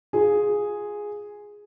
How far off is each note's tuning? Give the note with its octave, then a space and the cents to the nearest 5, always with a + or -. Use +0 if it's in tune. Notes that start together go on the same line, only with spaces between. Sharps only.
F4 +15 G#4 +0